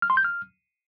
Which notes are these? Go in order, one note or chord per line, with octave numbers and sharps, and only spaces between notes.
F6
C6
G6
F6